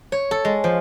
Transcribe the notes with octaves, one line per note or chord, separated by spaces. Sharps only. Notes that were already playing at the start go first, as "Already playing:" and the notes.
C#5
A4
G#3
F3